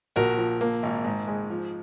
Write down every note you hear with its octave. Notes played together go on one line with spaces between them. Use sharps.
A#1 F#4 A#4
F3
A#3
G#1
G#2
G#3
F3